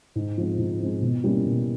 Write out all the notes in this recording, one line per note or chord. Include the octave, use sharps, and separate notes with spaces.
G#2
F3 G#3 C4
G#2
F3 G#3 C4
B2
G3 A#3 C#4 E4
B2